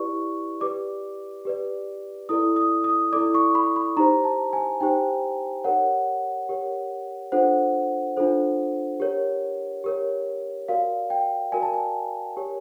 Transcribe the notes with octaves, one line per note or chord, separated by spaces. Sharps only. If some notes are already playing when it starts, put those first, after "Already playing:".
Already playing: E4 G4 B4 D5 C#6
G4 B4 D5 D6
G4 B4 D5
E4 A4 D5 D#6
D#6
D#6
E4 A4 D5 D6
C#6
B5
B5
D#4 G4 C5 A#5
A5
G#5
D#4 G4 C5 G5
G4 A#4 C#5 F#5
G4 A#4 C#5
D4 F4 A4 C5 F#5
D4 F4 A4 C5
G4 A#4 C#5
G4 A#4 C#5
F#4 A#4 D5 F5
G5
F#4 A#4 D5 G#5
A5
G#5
G4 A#4 C#5